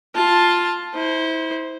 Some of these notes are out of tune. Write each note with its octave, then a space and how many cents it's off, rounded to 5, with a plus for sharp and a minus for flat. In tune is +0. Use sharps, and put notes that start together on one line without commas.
F4 +5 A5 +0
E4 -30 C5 +0